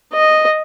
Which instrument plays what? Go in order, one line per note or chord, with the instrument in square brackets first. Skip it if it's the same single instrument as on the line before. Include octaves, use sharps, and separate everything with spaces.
[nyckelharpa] D#5